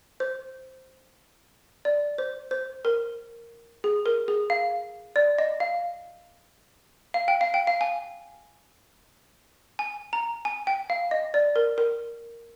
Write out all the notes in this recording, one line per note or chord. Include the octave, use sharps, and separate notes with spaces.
C5
D5
C5
C5
A#4
G#4
A#4
G#4
F5
D5
D#5
F5
F5
G5
F5
G5
F5
G#5
G#5
A#5
G#5
G5
F5
D#5
D5
A#4
A#4